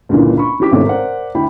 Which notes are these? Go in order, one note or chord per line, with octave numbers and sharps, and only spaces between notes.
C#2 G2 A#2 D3 E3
B5 C#6
E3 C#4 G4 D6 B6
G#1 A2 C3 G#3 A4 C#5
A#4 C5 D5 F#5
D2 E4 G5 B5